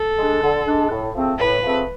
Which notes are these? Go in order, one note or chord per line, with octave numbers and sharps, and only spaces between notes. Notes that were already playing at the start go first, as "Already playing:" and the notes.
Already playing: A4
G#3 D4
D3
G#3 D4
A2
F3 A3 C4 G#4
A2 B4
F3 A3 C4 G#4